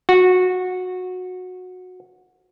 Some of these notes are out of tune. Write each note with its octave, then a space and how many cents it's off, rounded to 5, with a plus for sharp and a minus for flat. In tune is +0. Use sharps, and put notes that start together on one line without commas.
F#4 -15